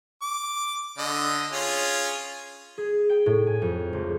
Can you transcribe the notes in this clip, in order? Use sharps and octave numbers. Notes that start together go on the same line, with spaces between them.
D6
D3 D#5
C#4 F4 G#4
G#4
G5
A2
G#5
F2
C#2